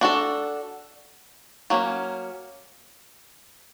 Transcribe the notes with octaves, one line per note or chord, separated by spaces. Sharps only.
D4 F#4 A4
F#3 A#3 C#4